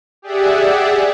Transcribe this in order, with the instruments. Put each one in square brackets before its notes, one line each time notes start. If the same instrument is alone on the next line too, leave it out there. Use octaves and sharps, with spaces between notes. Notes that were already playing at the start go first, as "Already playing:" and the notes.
[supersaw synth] G4 G#4 D5 E5 F#5